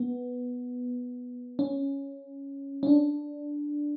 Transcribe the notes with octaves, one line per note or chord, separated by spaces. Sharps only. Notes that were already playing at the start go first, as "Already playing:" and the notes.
Already playing: B3
C#4
C#4
D4